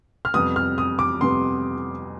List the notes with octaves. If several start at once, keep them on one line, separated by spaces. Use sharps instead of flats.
F6
F2 C3 G3 B3 D#6
F6
D#6
D6
F2 C3 G3 B3 C6